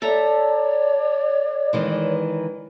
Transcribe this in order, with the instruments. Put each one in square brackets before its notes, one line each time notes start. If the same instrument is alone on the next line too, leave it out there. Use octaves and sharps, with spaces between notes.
[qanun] A4 E5 A#5 [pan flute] C#5 [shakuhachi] D5
[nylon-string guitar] D#3 E3 G#3